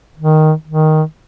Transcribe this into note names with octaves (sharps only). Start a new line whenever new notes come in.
D#3
D#3